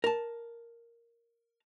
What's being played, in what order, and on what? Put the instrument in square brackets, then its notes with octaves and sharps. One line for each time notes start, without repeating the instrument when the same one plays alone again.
[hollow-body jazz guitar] A#4 A5